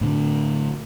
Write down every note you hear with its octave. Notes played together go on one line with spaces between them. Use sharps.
A2 D3